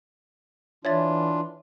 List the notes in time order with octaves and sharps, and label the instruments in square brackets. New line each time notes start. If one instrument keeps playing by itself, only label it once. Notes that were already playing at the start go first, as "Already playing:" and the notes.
[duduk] E3 [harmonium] D4 F4 [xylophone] C#5 E5 A6